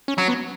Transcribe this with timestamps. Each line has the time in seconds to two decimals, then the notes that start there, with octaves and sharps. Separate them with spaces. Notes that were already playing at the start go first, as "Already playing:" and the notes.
0.08 C#4
0.18 F#3
0.28 B3